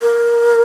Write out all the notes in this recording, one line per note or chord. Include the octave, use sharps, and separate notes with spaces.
A#4